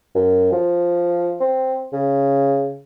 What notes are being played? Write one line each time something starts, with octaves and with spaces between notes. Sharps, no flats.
F#2
F3
C4
C#3